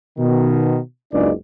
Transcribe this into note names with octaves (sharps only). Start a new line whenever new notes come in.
B2 D#3
F#1 C#2 C#3 D4 D#4 D5